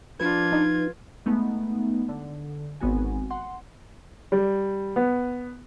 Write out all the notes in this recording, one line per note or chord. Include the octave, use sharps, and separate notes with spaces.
F3 D4 F4 B4 G#6
D#4
G#3 A3 B3 D#4
D3
G#1 B3 C4 F#4 G#5
F#5 C6
G3
B3